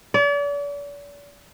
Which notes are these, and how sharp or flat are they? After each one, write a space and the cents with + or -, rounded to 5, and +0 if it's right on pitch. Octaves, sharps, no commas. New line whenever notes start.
D5 -40